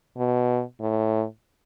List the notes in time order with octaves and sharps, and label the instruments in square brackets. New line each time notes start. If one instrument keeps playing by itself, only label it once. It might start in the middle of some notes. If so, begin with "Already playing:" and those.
[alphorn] B2
A2